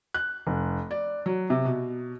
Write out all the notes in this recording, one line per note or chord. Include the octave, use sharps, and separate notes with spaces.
F#6
F1
D5
F#3
C3
B2